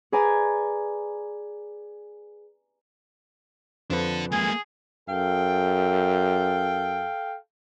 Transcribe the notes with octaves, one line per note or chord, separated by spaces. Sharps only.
G#4 B4 D5 G#5 A#5
F2 F3 D4 A4 B4
G#3 A#3 G#4 G#5
F#2 A4 F5 G5